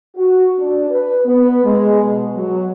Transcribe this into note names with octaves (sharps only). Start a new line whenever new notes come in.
F#4
D4
B4
B3
G#3
B2
F#3